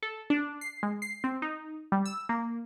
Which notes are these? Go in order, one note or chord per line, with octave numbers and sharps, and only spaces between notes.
A4
D4
C7
G#3
C7
C4
D#4
G3
E6
A#3